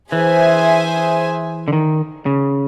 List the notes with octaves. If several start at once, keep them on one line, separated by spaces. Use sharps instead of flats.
E3 G#4 C5 E5 G#5
D3
D#3
C#3